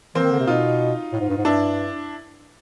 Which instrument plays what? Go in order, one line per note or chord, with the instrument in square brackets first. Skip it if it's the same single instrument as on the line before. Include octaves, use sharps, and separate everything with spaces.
[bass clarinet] E3 [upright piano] A#3 C4
[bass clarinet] D#3
D3
C3
[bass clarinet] B2 [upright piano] D#4 F4
[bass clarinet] A2
G#2
G2
G#2
[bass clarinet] G2 [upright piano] D4 E4